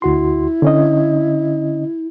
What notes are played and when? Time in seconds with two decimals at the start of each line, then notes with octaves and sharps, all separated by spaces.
0.02 D2 E4 F#4 C6
0.62 D3 C#4 D#5